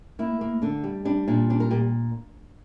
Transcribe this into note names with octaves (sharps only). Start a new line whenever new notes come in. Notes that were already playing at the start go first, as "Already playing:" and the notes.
A#3 E4
A#3
D3 D4
G3
G3 D4
A#2 D4
G3 D4
A#4
A#2 G4